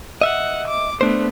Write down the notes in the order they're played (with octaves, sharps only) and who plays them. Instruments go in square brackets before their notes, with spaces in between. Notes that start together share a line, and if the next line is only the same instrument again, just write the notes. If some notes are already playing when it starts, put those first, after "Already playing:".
[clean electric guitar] D#5 E5 [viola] F#5
[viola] D6
[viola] A3 B3 [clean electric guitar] D4 C5